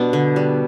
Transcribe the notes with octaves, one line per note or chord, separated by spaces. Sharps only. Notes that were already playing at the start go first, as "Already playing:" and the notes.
Already playing: B2 G3 B3 D4
D3
G3